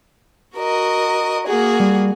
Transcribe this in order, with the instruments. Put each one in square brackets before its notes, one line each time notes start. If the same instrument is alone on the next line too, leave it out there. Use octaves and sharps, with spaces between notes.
[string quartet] F#4 A#4 D#5
A#3 F#4 G#4
[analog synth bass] G3